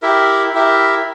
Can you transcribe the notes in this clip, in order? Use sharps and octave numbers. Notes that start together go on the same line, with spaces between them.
E4 G4 A#4 E5
E4 G4 A#4 E5